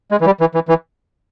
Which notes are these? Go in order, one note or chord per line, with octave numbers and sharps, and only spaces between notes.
G#3
E3
G3
E3
E3
E3